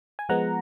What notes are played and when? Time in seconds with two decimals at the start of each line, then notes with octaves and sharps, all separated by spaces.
0.19 G#5
0.29 F3 G#3 B3 F#5 A#5